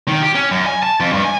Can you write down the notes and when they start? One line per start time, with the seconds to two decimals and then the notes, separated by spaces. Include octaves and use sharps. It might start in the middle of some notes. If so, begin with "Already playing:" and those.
0.08 D#3
0.22 G4
0.35 C#4
0.51 F#2
0.66 G#5
0.83 A5
1.00 F2
1.13 G2
1.25 G#5